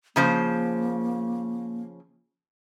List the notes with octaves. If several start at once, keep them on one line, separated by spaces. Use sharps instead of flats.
C#3 F3 A#3 C5